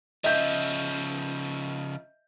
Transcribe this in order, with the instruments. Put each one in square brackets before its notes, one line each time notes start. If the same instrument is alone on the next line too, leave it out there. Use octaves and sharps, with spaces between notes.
[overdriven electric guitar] C#3 F3 [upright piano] D#5 E5 G6